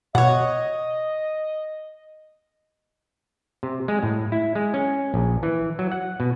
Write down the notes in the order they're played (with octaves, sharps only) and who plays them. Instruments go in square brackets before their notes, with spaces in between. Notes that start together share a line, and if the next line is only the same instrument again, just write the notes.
[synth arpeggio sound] B2 [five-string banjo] C#5 F#5 [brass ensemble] D#5
[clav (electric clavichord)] C3
G#3
A2
E4
G#3
C#4
A#1
E3
F#3
F#5
B2